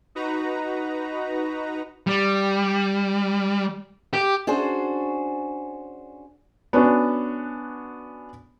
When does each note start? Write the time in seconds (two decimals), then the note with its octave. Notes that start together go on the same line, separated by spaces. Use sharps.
0.15 D#4 F#4 B4 A#5
2.07 G3
4.13 G4
4.47 C#4 D4 F#4 G#4 C5
6.73 B3 C#4 D4 F#4 B4